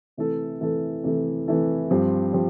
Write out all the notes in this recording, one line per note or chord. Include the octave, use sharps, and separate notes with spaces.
C3 E3 A3 E4 A4
C3 E3 A3 E4 A4
C3 E3 A3 E4 A4
C3 E3 A3 E4 A4
G2 F3 C4 G4
F3 C4 G4